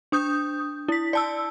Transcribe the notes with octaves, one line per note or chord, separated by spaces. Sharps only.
D4 D#6 G6
E4 B6
D5 A5 E6